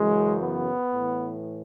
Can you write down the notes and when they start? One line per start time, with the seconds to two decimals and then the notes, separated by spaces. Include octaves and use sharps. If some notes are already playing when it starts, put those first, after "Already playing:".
Already playing: F#2 C#3 E3 G#3
0.39 B3
0.92 A2 E3